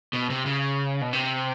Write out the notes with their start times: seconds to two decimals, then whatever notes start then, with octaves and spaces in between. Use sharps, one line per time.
0.13 B2
0.30 C3
0.46 C#3
1.01 B2
1.13 C3